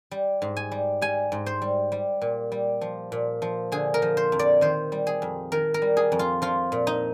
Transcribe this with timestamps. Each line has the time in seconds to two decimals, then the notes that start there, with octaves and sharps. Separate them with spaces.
0.11 G3
0.42 G#2
0.57 G#5
0.71 G3
1.01 G3 G#5
1.32 G#2
1.46 C5
1.62 G3
1.92 G3
2.22 A#2
2.52 G3
2.81 F3
3.12 A#2
3.42 F3
3.72 D3 G#4
3.94 A#4
4.02 F3
4.17 C5
4.32 F2
4.39 D5
4.61 D#3 C5
4.92 G3
5.07 G#4
5.22 F2
5.52 D#3 A#4
5.74 A#4
5.82 G3
5.97 G#4
6.12 F2
6.19 F4
6.42 F3 F4
6.72 A#2
6.87 D#4